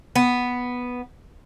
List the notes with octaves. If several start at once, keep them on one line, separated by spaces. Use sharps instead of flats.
B3